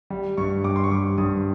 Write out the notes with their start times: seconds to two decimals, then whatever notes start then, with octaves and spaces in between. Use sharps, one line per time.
0.10 G3
0.37 G2 C#6
0.64 G2 D6
0.76 C6
0.84 C#6
0.91 G3 D6
1.18 G2 D#6